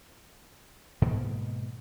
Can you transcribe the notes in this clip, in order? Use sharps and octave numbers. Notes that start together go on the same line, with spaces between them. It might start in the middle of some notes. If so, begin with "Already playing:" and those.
G#2 B2 D#3 A#3